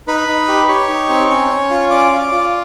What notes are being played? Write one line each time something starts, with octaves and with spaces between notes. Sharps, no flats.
D#4 B4 B5
D#4
G4
G4 C#5 C#6
D#4
C4
C#4 C#5 C#6
C#4
F4
C#4 D5 D6
F4
F4